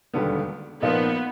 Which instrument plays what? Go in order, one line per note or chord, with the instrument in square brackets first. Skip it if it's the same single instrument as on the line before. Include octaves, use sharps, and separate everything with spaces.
[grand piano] E1 D#2 D3 G3 B3
[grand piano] A#2 F3 A#3 D#4 [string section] B3